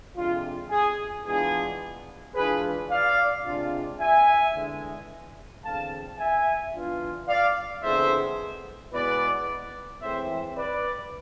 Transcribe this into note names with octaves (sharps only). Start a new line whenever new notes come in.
F2 C3 G#3 D4 F4
G#4
E3 G#3 B3 D4 F4 G#4
E3 G#3 D4 F4 G#4 B4
D5 F5
C3 G#3 D4 F4
E5 G#5
E2 D3 G#3
E2 D3 G#3 C4 F5 A5
E5 G#5
E3 B3 D4 F4
D5 F5
F2 D3 G#3 B3 E4 C5 E5
B2 G#3 B3 E4 B4 D5
A2 E3 G#3 C4 E4 C5 E5
B4 D5